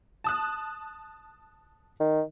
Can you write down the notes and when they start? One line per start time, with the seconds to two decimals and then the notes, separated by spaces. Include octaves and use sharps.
0.24 A5 D#6 F#6
2.00 D#3